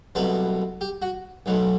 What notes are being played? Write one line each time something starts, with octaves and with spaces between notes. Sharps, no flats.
C2 B2 F#3 A3 B4
G4
F#4
B1 B2 F#3 A3